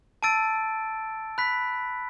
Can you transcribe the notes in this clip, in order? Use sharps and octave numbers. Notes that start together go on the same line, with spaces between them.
A5 E6 A6 D7
B5 F#6 B6